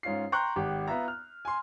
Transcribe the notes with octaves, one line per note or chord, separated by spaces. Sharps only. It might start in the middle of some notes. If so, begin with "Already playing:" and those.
G#2 C#4 F4 C7
G5 A#5 C6 C#6 F#6 G6
G#1 G4
B3 F4 E5 A#5
F6
G#5 C6